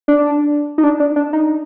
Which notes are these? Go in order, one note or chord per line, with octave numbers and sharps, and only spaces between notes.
D4
D#4
D4
D4
D4
D#4